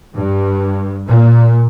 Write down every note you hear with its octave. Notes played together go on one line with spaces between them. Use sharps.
G2
A#2